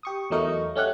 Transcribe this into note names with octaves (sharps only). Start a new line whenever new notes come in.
G4 C#6 D#6
E2 F#3 A3 D#4 A#4 C#6
A3 C#4 G4 F#5